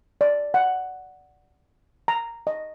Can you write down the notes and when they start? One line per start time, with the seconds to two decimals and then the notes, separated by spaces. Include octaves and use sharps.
0.21 D5
0.54 F#5
2.08 A#5
2.47 D#5